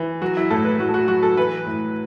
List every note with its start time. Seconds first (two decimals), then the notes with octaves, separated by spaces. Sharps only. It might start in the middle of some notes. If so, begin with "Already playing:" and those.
Already playing: E3
0.21 F#3 F#4
0.37 E4
0.50 A2 A4
0.64 B4
0.79 A2 F#4
0.89 A4
0.94 F#4
1.08 F#3 F#4
1.23 A4
1.37 E3 B4
1.66 A2